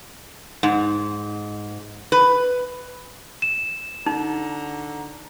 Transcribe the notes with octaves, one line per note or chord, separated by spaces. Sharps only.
G#2
B4
E7
D3 D#4 F#4 A#5